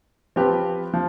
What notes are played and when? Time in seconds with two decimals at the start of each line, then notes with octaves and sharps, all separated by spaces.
0.36 F3 C4 G4 B4
0.94 F3